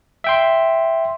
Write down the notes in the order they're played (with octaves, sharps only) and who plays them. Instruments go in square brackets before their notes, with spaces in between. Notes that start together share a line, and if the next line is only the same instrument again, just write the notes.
[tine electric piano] E5 G5 C6